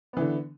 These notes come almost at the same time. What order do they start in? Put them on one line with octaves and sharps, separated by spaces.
B3 E3 D3